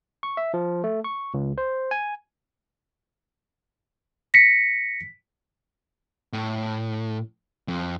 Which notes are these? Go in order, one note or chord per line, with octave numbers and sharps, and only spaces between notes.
C#6
E5
F3
A3
C#6
C#2
C5
G#5
A#6 B6 C#7
A2
F2